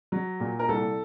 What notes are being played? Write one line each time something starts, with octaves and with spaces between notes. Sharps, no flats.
F#3
A#2
A#4
C2 A4